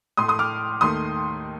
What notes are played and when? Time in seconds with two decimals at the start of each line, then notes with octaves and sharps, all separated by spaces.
0.17 A2 C6 D#6
0.22 A3
0.28 C6 D#6
0.39 D6 F6
0.81 D#2 D#3 A3 C6 D#6